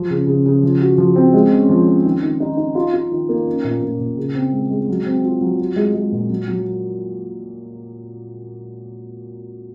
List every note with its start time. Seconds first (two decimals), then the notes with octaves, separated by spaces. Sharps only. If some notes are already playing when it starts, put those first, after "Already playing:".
Already playing: F3
0.10 C#3
0.27 C#3
0.46 C#3
0.63 F3
0.81 F#4
0.98 F3
1.16 C4
1.34 G#3
1.52 C#4
1.69 F3
1.86 C#4
2.05 D#3
2.23 D#3
2.40 D#4
2.57 D#4
2.75 F4
2.93 F4
3.12 D#3
3.29 A#3
3.46 C#4
3.64 A#2
3.82 A#2
3.99 A#2
4.17 C#3
4.34 C4
4.52 G#3
4.71 G#3
4.88 F#3
5.06 C4
5.24 F4
5.41 F#3
5.59 F4
5.76 G#3
5.94 G#3
6.12 A#2
6.29 F#3
6.48 F#3